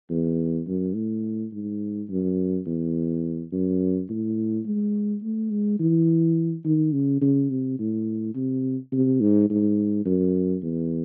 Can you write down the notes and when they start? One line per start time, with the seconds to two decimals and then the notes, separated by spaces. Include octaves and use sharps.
0.10 E2
0.68 F#2
0.95 A2
1.53 G#2
2.10 F#2
2.67 E2
3.52 F#2
4.09 A2
4.65 G#3
5.23 A3
5.51 G#3
5.80 E3
6.65 D#3
6.93 C#3
7.22 C#3
7.50 C3
7.79 A2
8.35 C3
8.92 C3
9.21 G#2
9.50 G#2
10.06 F#2
10.63 E2